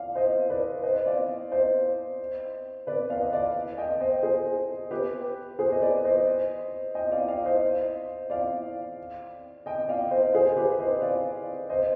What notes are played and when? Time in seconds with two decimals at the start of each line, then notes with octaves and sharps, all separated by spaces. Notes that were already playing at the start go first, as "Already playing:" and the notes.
Already playing: D5 F5
0.15 C5 D#5
0.50 B4 D5
0.83 C5 D#5
1.06 D5 F5
1.51 C5 D#5
2.87 B4 D5
3.10 D5 F5
3.21 D#5
3.33 D5 F5
3.78 D#5 G5
4.00 C5 D#5
4.23 G#4 C5
4.91 G4 B4
5.59 G#4 C5
5.72 D#5
5.82 B4 D5
6.04 C5 D#5
6.95 D#5 G5
7.11 D5 F5
7.28 D5 F5
7.45 C5 D#5
8.30 D5 F5
9.66 D#5 G5
9.88 D5 F5
10.11 C5 D#5
10.34 G#4 C5
10.56 G4 B4
10.80 C5 D#5
11.01 D5 F5
11.70 C5 D#5